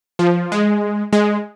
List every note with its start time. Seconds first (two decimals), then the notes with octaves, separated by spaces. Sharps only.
0.19 F3
0.52 G#3
1.13 G#3